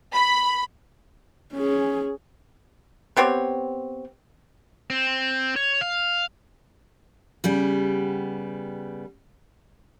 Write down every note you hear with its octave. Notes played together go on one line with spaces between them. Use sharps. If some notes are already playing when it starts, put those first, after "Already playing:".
B5
C#4 G#4
B3 C4 G4 C#5
C4
C#5
F5
C#3 G3 B3 G4